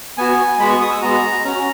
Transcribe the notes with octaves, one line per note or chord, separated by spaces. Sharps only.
B3 F#4 G#5
G#3 B3 F#4 B5
C#6
D#6
E6
G#3 B3 F#4 A#5
C#4 F#4 A#5